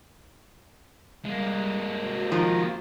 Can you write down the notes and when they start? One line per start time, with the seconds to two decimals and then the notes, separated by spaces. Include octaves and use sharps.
1.25 G3 G#3 A#3
1.97 F#4 G4 C5
2.32 D#3 F3